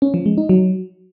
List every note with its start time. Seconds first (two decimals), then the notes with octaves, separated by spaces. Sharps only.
0.02 C#4
0.14 F3
0.26 G#3
0.38 D#4
0.49 F#3